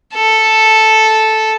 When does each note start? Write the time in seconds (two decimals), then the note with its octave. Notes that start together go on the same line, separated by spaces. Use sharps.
0.15 A4